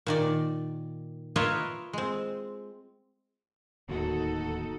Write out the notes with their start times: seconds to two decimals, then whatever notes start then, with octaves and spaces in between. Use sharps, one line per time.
0.06 A#2 D#3 D5
1.36 F4 A#4 B4 C#5 D#5 E5
1.93 G#3 C4
3.89 D1 D#2 D#4 F#4 A4